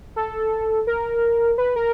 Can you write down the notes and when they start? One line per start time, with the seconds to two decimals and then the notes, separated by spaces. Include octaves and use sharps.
0.16 A4
0.87 A#4
1.58 B4
1.76 A#4